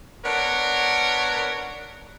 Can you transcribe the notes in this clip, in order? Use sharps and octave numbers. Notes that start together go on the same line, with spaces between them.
B3 D4 A#4 C#5